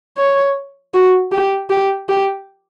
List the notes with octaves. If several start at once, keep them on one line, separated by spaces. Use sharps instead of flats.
C#5
F#4
G4
G4
G4